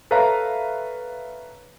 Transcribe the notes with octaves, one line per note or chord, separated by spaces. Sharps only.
A4 B4 C#5 E5 F5 A#5